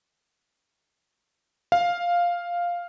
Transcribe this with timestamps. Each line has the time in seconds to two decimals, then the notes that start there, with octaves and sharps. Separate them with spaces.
1.72 F5